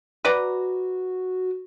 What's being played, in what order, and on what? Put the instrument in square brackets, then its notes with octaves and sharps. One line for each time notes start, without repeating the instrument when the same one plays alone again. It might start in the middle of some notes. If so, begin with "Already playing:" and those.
[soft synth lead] F#4 [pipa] B4 D5 A#5